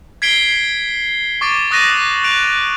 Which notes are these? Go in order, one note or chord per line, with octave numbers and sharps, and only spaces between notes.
G#6 B6 C7 D7 G7
C#6 D6 A6 D7
C#6 D#6 F#6 A6 A#6 D#7
F#6 D7 F7